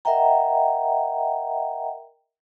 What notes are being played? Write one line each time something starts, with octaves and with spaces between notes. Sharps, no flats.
A#4 D#5 E5 F#5 G5 A#5